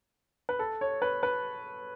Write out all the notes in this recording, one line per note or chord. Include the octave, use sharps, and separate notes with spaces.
B4
A4
C#5
B4
B4